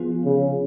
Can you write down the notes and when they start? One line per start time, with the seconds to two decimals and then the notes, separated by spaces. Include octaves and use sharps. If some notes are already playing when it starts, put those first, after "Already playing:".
Already playing: F3 B3 F4 G#4
0.25 C#3